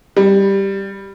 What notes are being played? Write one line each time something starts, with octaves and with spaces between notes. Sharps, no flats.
G3